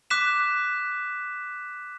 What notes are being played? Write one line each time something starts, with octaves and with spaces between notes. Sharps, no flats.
D6 F#6 B6 E7